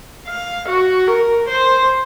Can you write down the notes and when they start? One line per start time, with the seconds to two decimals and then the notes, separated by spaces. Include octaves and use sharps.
0.28 F5
0.68 F#4
1.08 A#4
1.49 C5